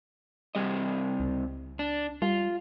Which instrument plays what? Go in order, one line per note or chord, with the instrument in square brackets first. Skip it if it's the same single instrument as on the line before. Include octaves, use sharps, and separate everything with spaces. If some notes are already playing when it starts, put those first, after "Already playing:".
[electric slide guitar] C3 G3 D#5
[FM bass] C#2
[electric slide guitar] D4
[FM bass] G3 [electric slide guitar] F4